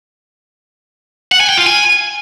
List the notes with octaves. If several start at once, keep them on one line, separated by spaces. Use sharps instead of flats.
F#5
G#5
G5
F4
G#5